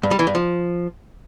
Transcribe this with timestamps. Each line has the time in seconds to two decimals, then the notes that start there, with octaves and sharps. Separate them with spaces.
0.03 G2
0.11 G3
0.19 E3
0.27 G2
0.35 F3